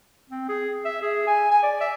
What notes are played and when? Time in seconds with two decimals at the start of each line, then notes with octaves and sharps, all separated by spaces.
0.30 C4
0.49 G#4
0.85 E5
1.02 G#4
1.27 G#5
1.51 G#5
1.63 D5
1.81 E5